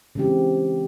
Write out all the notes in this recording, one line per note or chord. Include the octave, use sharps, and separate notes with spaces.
C#3 E3 G#3 C4 G4